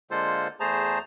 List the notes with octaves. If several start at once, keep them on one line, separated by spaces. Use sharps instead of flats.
D3 G#3 A#3 F4 A4 C5
E2 A3 G#4 C5 A5 A#5